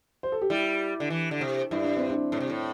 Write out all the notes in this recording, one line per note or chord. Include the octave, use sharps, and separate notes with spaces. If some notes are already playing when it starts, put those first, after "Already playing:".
C5
A4
G4
G3 E4
D3
E3
D3
C3
G2 E4
D4
C4
D4
A2
C3
A2